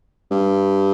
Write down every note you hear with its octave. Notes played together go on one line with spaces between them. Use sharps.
G2